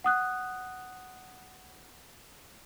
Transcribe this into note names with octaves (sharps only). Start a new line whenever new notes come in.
F#5 D#6 F#6